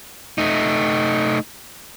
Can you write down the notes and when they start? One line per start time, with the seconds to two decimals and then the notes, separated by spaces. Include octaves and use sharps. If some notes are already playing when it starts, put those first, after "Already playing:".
0.38 A3 D#4